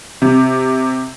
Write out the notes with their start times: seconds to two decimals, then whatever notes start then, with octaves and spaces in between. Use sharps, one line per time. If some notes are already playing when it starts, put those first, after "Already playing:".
0.22 C3